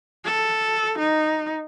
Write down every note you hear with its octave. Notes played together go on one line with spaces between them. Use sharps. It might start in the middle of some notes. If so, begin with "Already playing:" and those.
A4
D#4